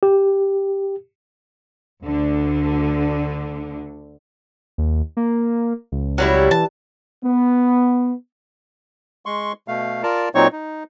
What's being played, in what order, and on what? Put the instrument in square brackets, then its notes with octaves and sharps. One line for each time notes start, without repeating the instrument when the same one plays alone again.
[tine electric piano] G4
[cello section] D2 D3
[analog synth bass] D#2
A#3
C#2
[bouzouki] F#3 G3 E4
[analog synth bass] E3 [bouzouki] A5
[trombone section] B3
[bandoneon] G#3 C6 C#6
B2 A3 F5
F4 A#4 D5 A5 A#5
A#2 F#3 C4 D#4 C#5 C#6
D#4